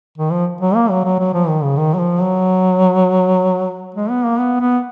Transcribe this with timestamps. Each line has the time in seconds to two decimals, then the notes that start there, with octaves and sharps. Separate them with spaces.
0.18 D#3
0.32 F3
0.61 F#3
0.75 A#3
0.90 F#3
1.04 F#3
1.19 F#3
1.34 F3
1.49 D#3
1.63 C#3
1.78 D#3
1.94 F#3
1.99 F3
2.21 F#3
3.95 G#3
4.10 B3
4.24 A#3
4.39 B3
4.61 B3